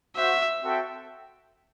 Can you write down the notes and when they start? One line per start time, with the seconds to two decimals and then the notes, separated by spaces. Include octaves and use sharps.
0.16 F#4 C5 E5 F#5
0.62 C4 F#4 A4 E5 G5